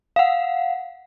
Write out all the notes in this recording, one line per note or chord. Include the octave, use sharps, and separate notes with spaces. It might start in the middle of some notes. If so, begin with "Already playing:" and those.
F5 F#5